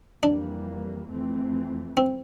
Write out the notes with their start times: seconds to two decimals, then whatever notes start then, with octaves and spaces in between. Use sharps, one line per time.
0.23 F2 E3 G3 A#3 D4
1.10 F2 E3 A3 C4
1.97 C4